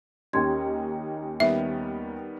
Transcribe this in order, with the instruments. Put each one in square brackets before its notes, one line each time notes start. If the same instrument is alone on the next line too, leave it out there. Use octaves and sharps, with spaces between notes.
[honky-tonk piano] D#2 C#4 D#4 [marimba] G4 C6 G#6
[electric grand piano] D#3 G3 B3 [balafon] E5